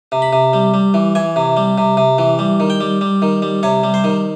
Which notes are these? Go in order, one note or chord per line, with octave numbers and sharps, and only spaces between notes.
C3
B5
C3
G3
G3
E3
E3 G#5
C3
G3
C3
C3
E3
G3
D#3
G5
G3
G3
D#3
G3
C3 C#5
G3
C5
D#3